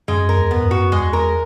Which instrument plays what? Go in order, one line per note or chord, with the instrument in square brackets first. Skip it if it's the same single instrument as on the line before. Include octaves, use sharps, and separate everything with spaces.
[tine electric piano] F#2 [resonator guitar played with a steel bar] G#3
[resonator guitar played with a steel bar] A#4
[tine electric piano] E2
[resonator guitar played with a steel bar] B3
[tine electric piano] G#2
F#2
[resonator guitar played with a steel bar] F#4
[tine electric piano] E2 [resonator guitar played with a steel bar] G#3
[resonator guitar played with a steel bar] A#4